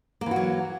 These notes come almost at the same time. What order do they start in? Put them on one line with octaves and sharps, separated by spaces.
A#3 E3 F#4 F#3